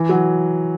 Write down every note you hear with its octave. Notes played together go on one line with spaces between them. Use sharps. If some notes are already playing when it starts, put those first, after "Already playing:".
Already playing: E3
F#3